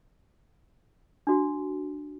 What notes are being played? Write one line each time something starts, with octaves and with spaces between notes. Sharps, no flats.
D4 F#4